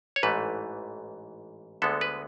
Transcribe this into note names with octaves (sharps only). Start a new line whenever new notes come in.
C#5
A1 G#2 E3 A3 B4
D2 D3 G#3 B3 A4
B4